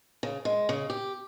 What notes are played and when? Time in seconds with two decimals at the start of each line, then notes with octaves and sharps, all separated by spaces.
0.23 C#3
0.45 G#3
0.69 C#3
0.90 G4